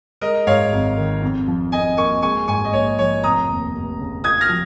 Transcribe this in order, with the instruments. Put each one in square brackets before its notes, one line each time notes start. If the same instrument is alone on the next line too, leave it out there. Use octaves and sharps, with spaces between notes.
[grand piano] G#3 [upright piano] A#4 D#5
[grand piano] G#2 [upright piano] C#5 F5
[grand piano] G#1
D#3
F2
F3
[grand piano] F2 [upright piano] D#5 G#5
[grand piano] A#3 [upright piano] G#5 C#6
[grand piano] G#3 [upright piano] G#5 C#6
[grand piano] G#2 [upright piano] G#5 C#6
[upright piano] D#5
[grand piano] A#1 [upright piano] C#5
[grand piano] F3 [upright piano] C#5
[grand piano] F1 [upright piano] A#5 D#6
[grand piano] D#2
F1
C#3
[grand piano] F4 [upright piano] D#6 G#6
[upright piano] F6 A#6
[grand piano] F3